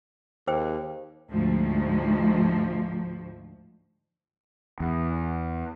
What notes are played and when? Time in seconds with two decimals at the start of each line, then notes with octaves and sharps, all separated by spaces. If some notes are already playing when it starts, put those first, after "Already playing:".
0.47 D#2 G#4 C5 G5
1.29 D2 G#2 F3
4.80 E2